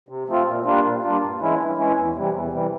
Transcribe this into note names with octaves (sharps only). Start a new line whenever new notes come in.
C3
F3 A3 C4 F4
A#2
G3 A#3 D4 F4
A#2
G3 A#3 D4 F4
G2
E3 G#3 C#4 E4
G2
E3 G#3 C#4 E4
E2
C3 E3 G3
E2
C3 E3 G3